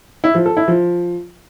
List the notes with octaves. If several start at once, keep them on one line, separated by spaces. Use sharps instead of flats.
E4
F3
A4
E4
F3